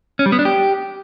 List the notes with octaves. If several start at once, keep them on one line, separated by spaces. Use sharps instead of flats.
C#4
G3
B3
D4
G4